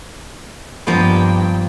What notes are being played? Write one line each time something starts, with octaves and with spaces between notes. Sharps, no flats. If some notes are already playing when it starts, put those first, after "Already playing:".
G2 F3 A#3 B3 G5